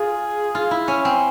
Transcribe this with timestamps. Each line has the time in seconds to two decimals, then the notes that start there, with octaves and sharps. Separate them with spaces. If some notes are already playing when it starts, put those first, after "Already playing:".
Already playing: F4 G#4
0.55 F4
0.71 E4
0.88 C#4
1.05 C4